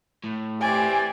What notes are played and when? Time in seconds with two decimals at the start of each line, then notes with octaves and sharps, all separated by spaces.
0.24 A2
0.61 E3 C4 G4 D5 G#5